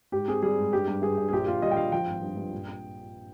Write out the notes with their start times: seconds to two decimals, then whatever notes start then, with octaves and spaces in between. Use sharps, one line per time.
0.12 G#2 G4
0.28 C4 G#4
0.43 G3 G#4
0.58 G#2
0.73 G2 G4
0.88 G2
1.02 G2 G#4
1.18 G2
1.29 G#4
1.33 A#1 G4
1.47 A#1 F4
1.62 G3 D#5
1.71 G5
1.77 G3 F5
1.92 F3 G5
2.07 G#1
2.22 G2
2.37 G2
2.52 A#1